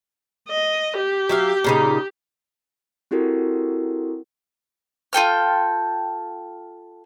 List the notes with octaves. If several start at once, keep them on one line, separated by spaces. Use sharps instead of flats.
D#5
G4
F#3 E5 F5
A#2 C#3 D#4
C4 E4 F#4 G4 A4 A#4
F4 A4 G5 F6